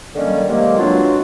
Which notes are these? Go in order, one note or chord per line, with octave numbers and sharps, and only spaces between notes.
D3 D#3 F#3 G3 A#3 C#4
C3 D#3 F#3 G#3 A#3
B2 F#3 C4 D4 F4